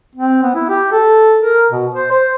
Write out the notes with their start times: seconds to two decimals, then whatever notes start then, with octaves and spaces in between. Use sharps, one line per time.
0.16 C4
0.43 B3
0.55 E4
0.69 G4
0.92 A4
1.42 A#4
1.70 B2
1.95 C5
2.12 C5